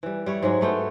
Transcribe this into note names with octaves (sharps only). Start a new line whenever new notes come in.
E3 G3
G3 E4 C#5
G#2 F#3 G#3
G#3 A3 B3 G5